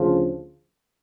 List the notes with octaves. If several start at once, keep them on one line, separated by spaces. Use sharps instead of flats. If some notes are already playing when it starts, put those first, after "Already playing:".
Already playing: D2 C#3 F3